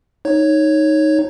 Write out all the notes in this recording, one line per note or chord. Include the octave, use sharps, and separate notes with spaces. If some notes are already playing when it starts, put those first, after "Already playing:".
D#4 C#5